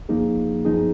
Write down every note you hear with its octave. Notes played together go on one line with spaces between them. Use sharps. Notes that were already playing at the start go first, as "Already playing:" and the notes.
F2 F3 A#3 D#4 G#4
F#2 F3 B3 D#4 G#4